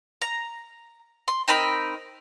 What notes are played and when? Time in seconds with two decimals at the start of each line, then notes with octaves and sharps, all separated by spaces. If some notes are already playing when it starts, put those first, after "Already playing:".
0.22 A#5
1.28 C6
1.48 C4 D#4 A#4 B5